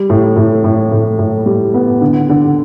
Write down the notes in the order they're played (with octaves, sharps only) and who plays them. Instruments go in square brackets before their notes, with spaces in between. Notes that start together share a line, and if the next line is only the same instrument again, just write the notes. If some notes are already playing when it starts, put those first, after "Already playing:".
Already playing: [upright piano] G3
A2
A2
A2
A2
A2
G3
B3
D3
D3